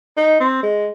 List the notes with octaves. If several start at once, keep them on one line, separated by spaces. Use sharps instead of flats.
D#4
C4
G#3